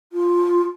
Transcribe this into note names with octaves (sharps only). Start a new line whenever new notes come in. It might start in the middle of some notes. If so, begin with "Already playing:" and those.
F4